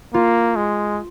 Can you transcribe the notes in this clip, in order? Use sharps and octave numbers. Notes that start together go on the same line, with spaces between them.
A#3 F4
G#3